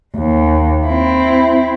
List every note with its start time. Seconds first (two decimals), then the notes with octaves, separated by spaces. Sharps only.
0.15 D#2
0.86 C4 E4